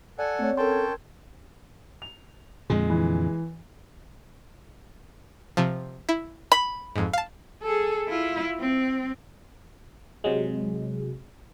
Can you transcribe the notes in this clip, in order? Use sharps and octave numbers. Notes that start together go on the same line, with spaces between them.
A4 D5 F#5 G#5
A3 C4 C#5
C#4 A4 A#4 G5 A5 C6
G#6
F7
F2 A#2 D3 G#3
E3
C3 F3
E4
B5
F2 G#2
F5 A5
G#4 A4
E4 F4
C4
C3 F#3 G#3